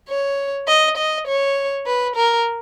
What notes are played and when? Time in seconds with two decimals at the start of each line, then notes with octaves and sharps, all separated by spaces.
0.09 C#5
0.68 D#5
0.97 D#5
1.27 C#5
1.86 B4
2.16 A#4